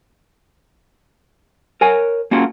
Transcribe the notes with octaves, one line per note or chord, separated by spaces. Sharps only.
A#4 C#5 G#5
A#3 C#4 F4 F#4